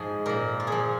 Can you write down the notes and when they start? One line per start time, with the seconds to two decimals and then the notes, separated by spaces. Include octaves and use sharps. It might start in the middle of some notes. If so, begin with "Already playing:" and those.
Already playing: G#2 F3 G#4
0.26 A#2 F3 A#4
0.60 F4
0.67 A#2 F3 G#4